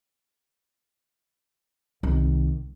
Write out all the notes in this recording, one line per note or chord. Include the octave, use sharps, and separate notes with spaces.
C2 D#3